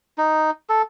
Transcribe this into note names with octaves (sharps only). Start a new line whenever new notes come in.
D#4
A4